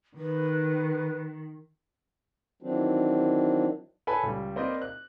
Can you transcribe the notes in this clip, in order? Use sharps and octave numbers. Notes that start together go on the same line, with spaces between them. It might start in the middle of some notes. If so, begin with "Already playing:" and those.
D#3 B4
D#3 E3 F#3 C4 D4
A4 B4 C#5 G#5 B5
C#2 G3
A#3 C4 B4 C5 D5 D#5
F#6